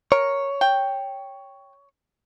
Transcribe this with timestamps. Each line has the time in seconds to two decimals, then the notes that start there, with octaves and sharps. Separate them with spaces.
0.12 A#4 C#5
0.61 G5